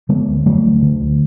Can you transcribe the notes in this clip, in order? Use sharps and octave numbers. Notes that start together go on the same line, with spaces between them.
D3 G#3 B3
D2
D3 F#3 A3
D2
D3
D2